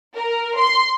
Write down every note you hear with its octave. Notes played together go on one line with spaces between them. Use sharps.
A#4
C6